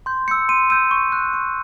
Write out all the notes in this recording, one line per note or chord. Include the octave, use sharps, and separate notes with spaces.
C6 G6
E6 G6 C#7
C6 D#7
E6 G6 D#7
C#6
F#6
C#6